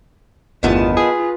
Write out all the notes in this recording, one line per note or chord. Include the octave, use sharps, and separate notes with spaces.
G1 E2 D#3 A3 B3 F4 A5
F4 G#4 B4